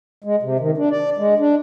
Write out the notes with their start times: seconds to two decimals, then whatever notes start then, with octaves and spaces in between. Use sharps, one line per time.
0.24 G#3
0.42 C3
0.60 D#3
0.77 D4
0.91 D5
1.18 G#3
1.40 D4